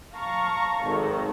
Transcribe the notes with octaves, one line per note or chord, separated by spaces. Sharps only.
F5 A5 A#5 C#6
G#1 D#3 A4